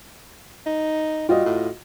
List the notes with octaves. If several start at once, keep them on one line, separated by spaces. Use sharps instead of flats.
D#4
G3 F4 F#4 D#5
A2